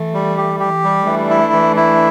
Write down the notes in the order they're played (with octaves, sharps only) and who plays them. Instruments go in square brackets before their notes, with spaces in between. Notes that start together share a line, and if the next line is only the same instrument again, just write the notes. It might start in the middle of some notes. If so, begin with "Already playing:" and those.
Already playing: [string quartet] E3 A3
[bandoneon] G3
G4
[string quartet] E3 [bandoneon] G4
[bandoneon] G3
[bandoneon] E3 [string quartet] A3 D4
[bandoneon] E4
E3
E4